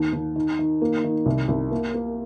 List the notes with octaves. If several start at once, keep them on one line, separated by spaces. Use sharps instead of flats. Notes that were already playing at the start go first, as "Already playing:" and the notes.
Already playing: D#2
D#2
D#3
D#3
A#3
D#3
C2
C2
A#3
A#3